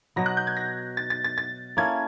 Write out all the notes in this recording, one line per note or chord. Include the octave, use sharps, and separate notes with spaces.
B2 F#3 B3 A#6
F#6
G6
G#6
A#6
A6
A6
A6
A6
A#3 C#4 E4 A4 G#6